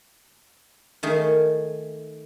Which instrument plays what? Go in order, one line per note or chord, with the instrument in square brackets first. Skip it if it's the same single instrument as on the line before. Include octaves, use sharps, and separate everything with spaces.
[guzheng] D#3 A3 G#4